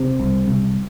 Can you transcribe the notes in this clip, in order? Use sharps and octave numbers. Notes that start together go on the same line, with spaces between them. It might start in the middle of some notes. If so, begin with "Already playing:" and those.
Already playing: C3 C4
C2
C2